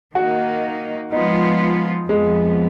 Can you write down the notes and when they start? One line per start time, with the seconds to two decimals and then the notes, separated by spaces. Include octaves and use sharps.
0.15 D#3 A#3 D#4 F#4
1.12 F3 G#3 B3 D#4 F4
2.08 F2 F3 G#3 B3